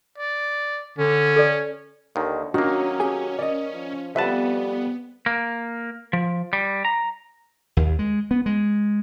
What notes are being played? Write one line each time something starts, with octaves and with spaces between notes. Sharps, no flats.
D5
D3 C#4
A4 D5
D#2 D3 D#3
D#3 F#3 A#3 C#4 D4 F#4
G4 G#4 G#5
A#4 D5 D#5
F3
F2 G3 B3 B4 E5 F#5 A5
A#3
F3
G3
A#5
D#2
G#3
B3
G#3